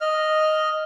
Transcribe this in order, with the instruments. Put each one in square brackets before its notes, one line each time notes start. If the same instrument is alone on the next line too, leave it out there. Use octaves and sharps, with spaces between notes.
[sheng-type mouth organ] D#5 F6